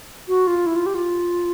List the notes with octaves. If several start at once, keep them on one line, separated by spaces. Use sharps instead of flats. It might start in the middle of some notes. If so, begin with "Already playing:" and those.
F#4
F4
E4
F4
G4
F4